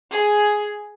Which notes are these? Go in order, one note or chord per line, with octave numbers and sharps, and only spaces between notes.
G#4